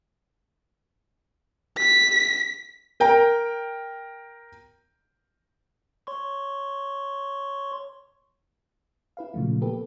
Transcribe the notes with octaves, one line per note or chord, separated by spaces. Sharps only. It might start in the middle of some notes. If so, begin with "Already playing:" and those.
B6
A#4 G5 A#5
C#5 C6 C#6
E4 B4 F5
A#2 C#3 F3 F#3 A3
A#3 B3 G4 A4 B4